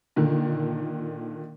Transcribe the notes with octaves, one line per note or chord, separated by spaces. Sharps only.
A#2 D3 D#3